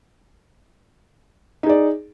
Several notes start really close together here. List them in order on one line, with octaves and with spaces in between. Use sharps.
D#4 G#4 D5